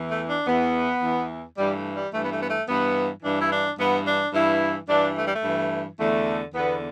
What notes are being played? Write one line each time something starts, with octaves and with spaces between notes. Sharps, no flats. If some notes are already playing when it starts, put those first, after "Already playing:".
Already playing: E2 E3
A3
D4
E2 E3 B3
E2 E3
G2 E3 G3
A3
G3
G2 E3 A3
B3
A3
B3
A3
G2 E3 B3
G2 E3 D4
E4
D4
G2 E3 B3
D4
G2 E3 E4
G2 E3 D4
A3
G3
A3
G2 E3
E2 D3 A3
E2 D3 B3